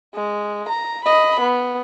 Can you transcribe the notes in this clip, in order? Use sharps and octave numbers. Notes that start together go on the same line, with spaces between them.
G#3
A#5
D#5 B5
B3